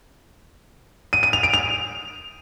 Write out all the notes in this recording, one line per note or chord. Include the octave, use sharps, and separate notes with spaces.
D#7
D#7
F7
D7
F7